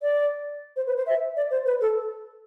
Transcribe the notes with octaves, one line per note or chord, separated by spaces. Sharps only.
D5
C5
B4
C5
E5
D5
C5
B4
A4